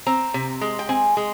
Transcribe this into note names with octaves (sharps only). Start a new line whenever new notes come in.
C4 A#5
C3
G#3
G5
C4 G#5
G#3